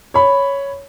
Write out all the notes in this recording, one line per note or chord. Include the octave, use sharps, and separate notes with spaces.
C#5 B5